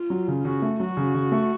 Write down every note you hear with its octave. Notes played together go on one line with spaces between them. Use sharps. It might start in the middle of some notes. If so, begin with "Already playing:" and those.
Already playing: F4
F#3
C#3
C#3 F#4
A3
F#3 F#4
C#3
C#3
A3